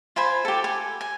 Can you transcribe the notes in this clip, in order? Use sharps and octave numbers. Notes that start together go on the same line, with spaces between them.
F4 C5 G#5 B5
G4 A4
G#5
G#5